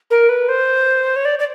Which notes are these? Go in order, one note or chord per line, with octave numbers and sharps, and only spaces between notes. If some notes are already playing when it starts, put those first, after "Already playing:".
A#4
B4
C5
C#5
D5
D5